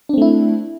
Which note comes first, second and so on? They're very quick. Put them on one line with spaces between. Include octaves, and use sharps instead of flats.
D4 C4 A3 E4